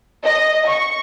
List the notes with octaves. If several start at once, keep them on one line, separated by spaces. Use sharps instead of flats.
D#5
C#6